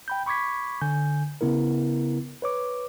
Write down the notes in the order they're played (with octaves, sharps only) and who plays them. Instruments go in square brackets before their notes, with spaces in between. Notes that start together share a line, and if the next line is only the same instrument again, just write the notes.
[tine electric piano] G5 B5 G6
B5 C#6 D6 G#6 B6
D3 G#5 G6
C#3 B3 E4 A#4
B4 C#5 D6